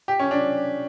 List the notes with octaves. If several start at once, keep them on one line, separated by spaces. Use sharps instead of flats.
G4
C#4
D4